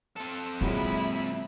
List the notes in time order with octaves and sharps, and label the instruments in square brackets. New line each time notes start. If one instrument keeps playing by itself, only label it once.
[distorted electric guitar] C4 A4
[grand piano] A#2 F#3 G#3 [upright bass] D3 [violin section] E4 E5 B5